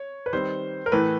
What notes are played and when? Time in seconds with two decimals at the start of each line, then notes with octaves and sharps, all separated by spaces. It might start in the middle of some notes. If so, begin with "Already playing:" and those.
Already playing: C#5
0.26 B4
0.33 D#3 G3 C4 C5
0.86 A#4
0.92 A2 E3 A3 B4